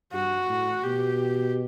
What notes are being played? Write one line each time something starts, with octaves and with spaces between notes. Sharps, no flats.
G2 F#4
A2
B2 G4